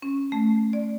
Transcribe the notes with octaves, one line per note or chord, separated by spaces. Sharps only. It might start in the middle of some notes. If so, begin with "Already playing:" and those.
C#4
A3
D5